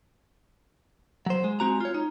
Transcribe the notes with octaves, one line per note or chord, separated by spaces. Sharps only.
F#3 C5
G#3
G#3 C4 F#4 A#5
F4 C#5
D#4